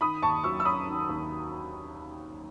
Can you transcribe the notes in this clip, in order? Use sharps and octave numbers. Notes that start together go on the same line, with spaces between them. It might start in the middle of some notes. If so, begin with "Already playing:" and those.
D#3 B5 D#6
D#2 A5 C#6
F#3 C#6 E6
E6
C#4 B5 D#6
D#3
D#2